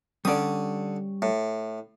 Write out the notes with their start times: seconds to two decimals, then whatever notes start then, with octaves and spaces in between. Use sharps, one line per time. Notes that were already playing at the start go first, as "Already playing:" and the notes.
0.25 D3 G3 C#4 D5 D#6
1.22 A2